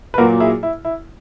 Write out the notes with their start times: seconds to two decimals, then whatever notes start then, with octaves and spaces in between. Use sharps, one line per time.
0.14 B4
0.18 A#2 F#3 A#3 F#4 A#4
0.40 E4 G#4
0.63 E4
0.85 E4